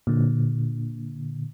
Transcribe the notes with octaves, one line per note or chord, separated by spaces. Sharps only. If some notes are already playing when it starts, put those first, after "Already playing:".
A#2 D3